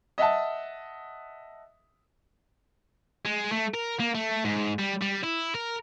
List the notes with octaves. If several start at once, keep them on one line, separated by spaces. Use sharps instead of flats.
D#5 E5 F#5 A5
G#3
A3
A#4
A#3
A3
G#2
G3
G3
E4
A#4